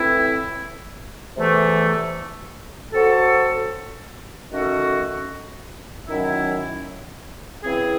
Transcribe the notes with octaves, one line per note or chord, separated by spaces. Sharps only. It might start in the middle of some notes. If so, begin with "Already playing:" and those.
Already playing: A2 E3 C4 E4
E2 C3 E3 A3
F#3 C4 F#4 A4
D#3 A3 C#4 F#4 A4
F#2 D#3 F#3 C#4 E4
C#3 E3 C4 E4 G#4